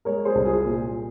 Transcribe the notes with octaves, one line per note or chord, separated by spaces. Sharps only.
G#3 A#4 C#5
G#4 C5
C2
F4 G#4
A#2